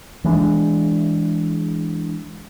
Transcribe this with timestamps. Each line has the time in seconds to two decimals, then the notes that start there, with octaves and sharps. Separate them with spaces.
0.24 E3 G#3 C4 D4